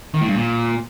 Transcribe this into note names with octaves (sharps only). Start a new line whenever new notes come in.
D#3
A2
G2
A#2